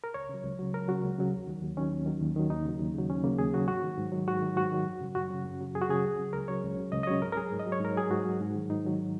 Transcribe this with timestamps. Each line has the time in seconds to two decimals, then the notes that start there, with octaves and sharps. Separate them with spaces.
0.04 A#4
0.14 C#2 C#5
0.29 C#3 F#3
0.43 C#2
0.59 C#3 F#3
0.73 C#2 A#4
0.88 C#3 F#3 F#4
1.03 C#2
1.18 C#3 F#3
1.32 D#2
1.47 D#3 F#3
1.63 D#2
1.77 D#3 F#3 C#4
1.91 D#2
2.06 D#3 F#3
2.21 D#2
2.36 D#3 F#3
2.50 D#2 D#4
2.64 C#3 F#3
2.79 D#2
2.94 C#3 F#3
3.09 D#2 C#4
3.24 C#3 F#3 A#3
3.39 D#2 G#4
3.53 C#3 F#3 F#4
3.68 G#2 F#4
3.83 D#3 F#3
3.98 G#2
4.12 D#3 F#3
4.28 G#2 F#4
4.42 D#3 F#3
4.56 G#2 F#4
4.72 D#3 F#3
4.87 F#2
5.01 C#3 F#3
5.15 F#2 F#4
5.30 C#3 F#3
5.45 F#2
5.60 C#3 F#3
5.75 F#2 G#4
5.82 F#4
5.90 C#3 F#3 G#4
6.04 C#2
6.19 C#3 F#3
6.33 C#2 A#4
6.48 C#3 F#3 C#5
6.63 C#2
6.77 C#3 F#3
6.92 C#2 D#5
7.03 D#5
7.07 C#3 F#3 C#5
7.21 G#2 A#4
7.32 A#4
7.37 F#3 G#4
7.52 G#2
7.59 D#5
7.66 F#3
7.72 C#5
7.80 G#2 A#4
7.96 F#3 G#4
8.10 G#2 F#4
8.26 F#3
8.40 G#2
8.54 D#3 F#3
8.69 G#2 D#4
8.84 D#3 F#3